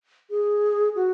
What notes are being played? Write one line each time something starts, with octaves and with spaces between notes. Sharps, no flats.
G#4
F#4